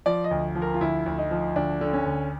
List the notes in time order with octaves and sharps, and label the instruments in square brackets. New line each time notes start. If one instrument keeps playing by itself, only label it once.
[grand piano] F3 D5
D#5
D2
F3
A#4
F4
D2 E4
D2
D#4
F3
D2 D4
D3
C#4
D2